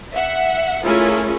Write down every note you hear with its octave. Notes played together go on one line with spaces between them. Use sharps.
E5 F#5
A3 C#4 E4 F4 G#4 A#4